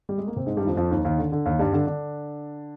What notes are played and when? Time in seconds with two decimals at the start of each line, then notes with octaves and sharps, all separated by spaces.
0.09 G3
0.18 G#3
0.27 A#3
0.36 C3 C4
0.46 G#2 G#3
0.57 G2 G3
0.62 D#3
0.67 F2 F3
0.77 F2 F3
0.91 D#2 D#3
1.05 D#2 D#3
1.18 D3
1.32 D3
1.46 D#2 D#3
1.59 G2 G3
1.73 D3 D4
1.87 D3 D4